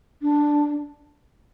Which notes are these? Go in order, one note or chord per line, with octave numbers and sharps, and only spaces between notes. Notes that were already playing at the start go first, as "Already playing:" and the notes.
D4